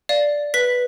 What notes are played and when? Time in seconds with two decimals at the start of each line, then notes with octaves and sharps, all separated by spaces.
0.09 D5 F5
0.54 B4 B6